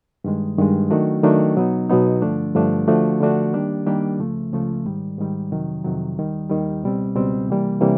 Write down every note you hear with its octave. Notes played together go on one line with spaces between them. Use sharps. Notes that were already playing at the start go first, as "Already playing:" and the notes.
G2 D#3 G#3
G2 D#3 G#3
D#3 F#3 A3 D4 F#4
D#3 F#3 A3 D4 F#4
B2 F#3 B3 D#4
B2 F#3 B3 D#4
G2 D3 F3 A3 D4
G2 D3 F3 A3 D4
D3 F3 A3 D4 F#4
D3 F3 A3 D4 F#4
D#3 G3 A#3 D4 G4
D#3 G3 A#3 D4 G4
C#2 C#3 F3 A3
C#2 C#3 F3 A3
G#2 D#3 G3
G#2 D#3 G3
F2 C3 D#3 F#3
F2 C3 D#3 F#3
D#2 D#3 G3
D#2 D#3 G3
C#2 B2 G3 C4
C#2 B2 G3 C4
C3 E3 G3 A#3
C3 E3 G3 A#3